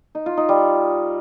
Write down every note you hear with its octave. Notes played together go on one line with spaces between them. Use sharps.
D#4
F4
D#4
G3